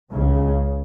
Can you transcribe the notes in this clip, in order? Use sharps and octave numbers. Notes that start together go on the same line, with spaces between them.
C#2 C#3